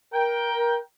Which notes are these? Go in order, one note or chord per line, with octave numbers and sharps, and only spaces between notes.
A#4 G5